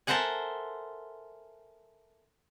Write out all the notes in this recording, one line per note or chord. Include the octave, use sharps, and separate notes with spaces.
A4 A#4 C5 E5 F#5 G#5